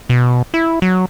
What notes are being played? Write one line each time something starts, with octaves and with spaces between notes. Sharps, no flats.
B2
E4
F#3